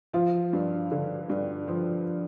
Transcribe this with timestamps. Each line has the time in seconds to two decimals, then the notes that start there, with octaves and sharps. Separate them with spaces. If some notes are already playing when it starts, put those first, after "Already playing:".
0.13 F3 F4
0.53 G2
0.92 D3
1.29 G2
1.68 F3